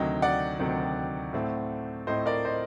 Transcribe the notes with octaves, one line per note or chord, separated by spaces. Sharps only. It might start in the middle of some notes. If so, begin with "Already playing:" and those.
Already playing: D2 C3 D#3 F#3 D#5 G5
D5 F#5
D2 C3 D#3 F#3
A2 A3 C4
A2 A3 C4 C5 D#5
A#4 D5
C5 D#5